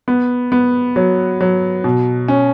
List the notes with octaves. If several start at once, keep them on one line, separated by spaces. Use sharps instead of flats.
B3
B3
F#3
F#3
B2
C#4